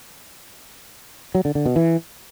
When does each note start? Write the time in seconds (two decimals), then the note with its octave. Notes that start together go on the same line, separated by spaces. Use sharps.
1.35 F#3
1.45 D3
1.55 D3
1.66 B2
1.76 E3